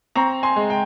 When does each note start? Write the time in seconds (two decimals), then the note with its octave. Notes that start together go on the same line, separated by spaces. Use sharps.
0.15 C4 A#5 C#6
0.43 G#5 C6
0.56 G#3
0.70 G5